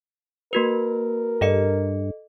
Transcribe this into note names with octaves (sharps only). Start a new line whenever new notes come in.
A#3 F#4 A#4 B4
G2 A4 D#5 C#7